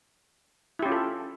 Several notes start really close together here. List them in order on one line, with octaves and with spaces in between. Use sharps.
E4 G4 C#4 F4 A4